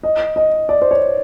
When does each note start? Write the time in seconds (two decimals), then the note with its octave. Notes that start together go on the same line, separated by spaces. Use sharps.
0.03 D#5
0.36 D#5
0.69 D5
0.82 C5
0.91 C#5